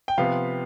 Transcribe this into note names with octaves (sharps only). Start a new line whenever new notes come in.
G5
C3 F3 B3 F5